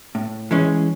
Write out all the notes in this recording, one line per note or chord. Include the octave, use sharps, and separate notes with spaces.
A2
E3 G#3 C#4